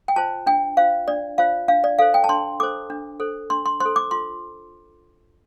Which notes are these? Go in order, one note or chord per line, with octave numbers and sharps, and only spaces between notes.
G5
F4 C5 A5
D4 G5
F4 C5 F5
D4 D5
F4 C5 F5
D4 F5
D5
A4 C5 F5
G5
A5
D4 C6
A4 C5 D6
D4
A4 C5
D4 C6
C6
C5 C6
A4
D6
F4 C6